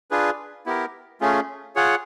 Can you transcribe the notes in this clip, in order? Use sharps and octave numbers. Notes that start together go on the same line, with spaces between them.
D4 F4 G#4 B4
B3 E4 G4 A#4
A3 C#4 F4 G#4
F4 G#4 C#5 F#5